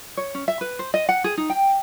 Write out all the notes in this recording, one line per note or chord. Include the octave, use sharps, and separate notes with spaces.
C#5
C#4
E5
B4
C5
D#5
F#5
G#4
D#4
G5